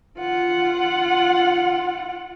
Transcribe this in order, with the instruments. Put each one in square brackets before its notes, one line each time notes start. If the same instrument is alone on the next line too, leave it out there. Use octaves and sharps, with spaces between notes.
[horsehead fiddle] F4 F#5